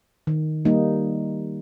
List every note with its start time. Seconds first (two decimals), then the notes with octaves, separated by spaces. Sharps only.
0.27 D#3
0.65 G3 A#3 D#4